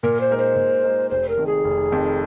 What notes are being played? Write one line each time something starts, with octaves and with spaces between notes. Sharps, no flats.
A#2 A#4
C5
G#3 D#4 A#4
C5
A#2
G#3 D#4 A#4
F1 C5
A#4
F2 D#3
G#4
F1
F2 D#3